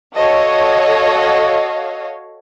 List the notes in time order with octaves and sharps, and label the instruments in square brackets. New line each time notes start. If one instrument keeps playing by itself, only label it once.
[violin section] F#4 A4 C#5 D#5 F5